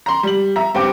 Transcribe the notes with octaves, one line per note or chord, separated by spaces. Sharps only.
A#5 C6
G3 F#7
E5 A#5
G2 C4 G5 D6